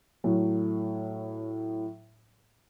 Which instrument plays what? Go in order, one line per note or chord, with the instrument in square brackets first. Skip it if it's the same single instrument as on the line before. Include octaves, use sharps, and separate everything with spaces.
[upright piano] A2 F#3